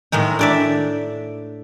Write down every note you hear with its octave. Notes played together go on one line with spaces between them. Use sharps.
A2 D#3 G#3 D#4
D4 D5 E5